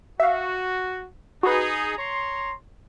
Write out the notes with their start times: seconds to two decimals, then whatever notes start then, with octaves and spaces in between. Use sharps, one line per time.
0.20 F#4 E5 F5
1.43 D#4 F#4 G#4 B4
1.97 C#5 A#5 C6